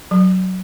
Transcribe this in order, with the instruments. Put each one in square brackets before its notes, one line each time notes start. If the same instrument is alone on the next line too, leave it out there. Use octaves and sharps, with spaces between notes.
[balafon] F#3